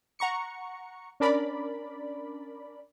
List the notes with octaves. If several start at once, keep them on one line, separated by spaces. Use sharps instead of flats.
F#5 A#5 C#6 C#7
C#4 D4 A#4 D5 B5